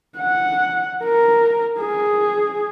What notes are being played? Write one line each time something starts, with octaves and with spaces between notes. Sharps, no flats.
F#5
A#4
G#4